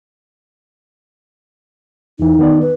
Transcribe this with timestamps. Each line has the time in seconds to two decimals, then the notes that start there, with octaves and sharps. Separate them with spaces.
2.19 E2 E3 D#4
2.39 D#3 B3 D5
2.62 B4